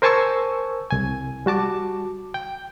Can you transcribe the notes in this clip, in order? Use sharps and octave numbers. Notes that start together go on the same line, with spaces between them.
A#4 C5 G#5 A5 C#6 E6
C2 G#5
G3 F#4 A5 D6
G5